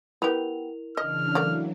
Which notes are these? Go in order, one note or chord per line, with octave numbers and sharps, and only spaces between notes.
B3 E4 G4 A#4 F7
C#3 E3 D4 D#5 F6
E3 F#3 A3 A#3 D5